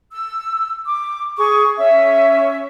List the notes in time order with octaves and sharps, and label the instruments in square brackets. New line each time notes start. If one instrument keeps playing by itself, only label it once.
[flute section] E6
D6
G#4 C#6
C#4 E5